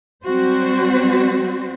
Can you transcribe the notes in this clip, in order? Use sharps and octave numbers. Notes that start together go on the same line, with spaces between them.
F#3 G3 C4 F#4 C5